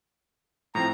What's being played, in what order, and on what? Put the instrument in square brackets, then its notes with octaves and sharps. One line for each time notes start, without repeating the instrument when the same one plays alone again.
[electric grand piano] A2 F3 C4 [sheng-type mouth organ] A#5